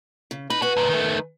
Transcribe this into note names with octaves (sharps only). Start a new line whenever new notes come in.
C#3
D#4 B4
F#4 B4 G#5
D2 A#2
D#3 A3